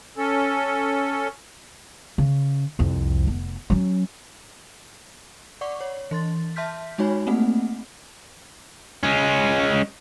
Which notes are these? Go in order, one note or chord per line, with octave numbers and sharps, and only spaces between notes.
C#4 A4
C#3
C2 F2
F1 B3
F#3 C#4
D5 F#5 C#6 D6
C#5
E3 C6 A6
E5 A5 C6 F6 G6 B6
G#3 D#4 F#4 C#5 G#5 B5
A3 A#3 C4 F#5
G#3 C#4